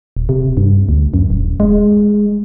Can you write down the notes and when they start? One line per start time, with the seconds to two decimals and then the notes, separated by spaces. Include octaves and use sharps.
0.17 D#1
0.29 C3
0.57 G2
0.89 D2
1.14 F#2
1.30 D#1
1.60 G#3